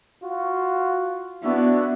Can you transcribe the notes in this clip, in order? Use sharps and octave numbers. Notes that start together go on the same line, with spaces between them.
F4 F#4
B3 D4 E4 F#4